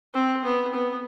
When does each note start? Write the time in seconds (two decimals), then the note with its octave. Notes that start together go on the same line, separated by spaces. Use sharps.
0.14 C4
0.45 B3
0.74 B3